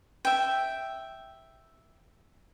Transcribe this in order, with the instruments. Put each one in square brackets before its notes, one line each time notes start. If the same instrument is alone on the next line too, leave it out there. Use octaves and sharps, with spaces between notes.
[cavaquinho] E5 G5